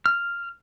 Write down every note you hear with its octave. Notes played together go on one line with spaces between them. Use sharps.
F6